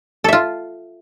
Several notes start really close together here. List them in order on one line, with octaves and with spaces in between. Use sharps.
A4 E5 F4